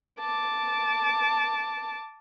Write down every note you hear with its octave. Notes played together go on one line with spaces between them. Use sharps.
A5 D6